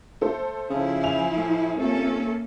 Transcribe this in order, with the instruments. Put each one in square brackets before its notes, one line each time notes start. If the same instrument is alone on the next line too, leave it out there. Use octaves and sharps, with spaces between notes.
[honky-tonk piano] A3 A4 C5
[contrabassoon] C#3 [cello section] F3 E4
[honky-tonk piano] E5 G#5 F7
[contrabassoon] A2
[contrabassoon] F1 [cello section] A#3 C#4 A4